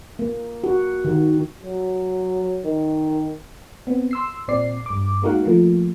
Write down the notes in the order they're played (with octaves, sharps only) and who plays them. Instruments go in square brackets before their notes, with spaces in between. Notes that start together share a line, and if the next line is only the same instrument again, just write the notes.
[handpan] A#3
F#4
D#3
[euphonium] F#3
D#3
[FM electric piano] B3 C4
C6 E6 C7
A#2 C4 D5 C7
G2 D6
G#3 A#3 D#4 F#4 F5 F#5
F3 A3 A#3